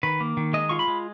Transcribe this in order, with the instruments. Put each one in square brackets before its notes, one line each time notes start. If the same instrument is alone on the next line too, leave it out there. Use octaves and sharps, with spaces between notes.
[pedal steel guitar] D#3 B4
A#3
D#3
G#3 D#5
F4 C#6
B5
G#3